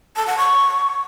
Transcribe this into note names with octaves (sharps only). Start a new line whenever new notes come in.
A5
F#5
C#6